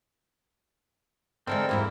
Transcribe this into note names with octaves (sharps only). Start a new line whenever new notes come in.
D3 E3 G#3 C4 A4 A#4 E6
E2 G#2 G3 A#3 E4